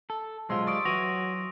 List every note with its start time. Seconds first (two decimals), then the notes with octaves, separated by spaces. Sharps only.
0.10 A4
0.50 B1 G#3 F4 C5 C6 E6
0.67 G3 D5 C#6 D#6 D7
0.85 E3 F#3 F#4 D#6 A#6 F7